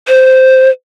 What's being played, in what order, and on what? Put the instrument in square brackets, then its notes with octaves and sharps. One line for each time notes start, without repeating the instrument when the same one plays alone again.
[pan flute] C5